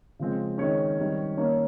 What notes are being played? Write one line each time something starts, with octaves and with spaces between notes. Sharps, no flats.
C#3 F3 G#3 C4
D#3 G#3 C4 C#4 C#5
D#3 G3 C4
D#3 A#3 C#4 C#5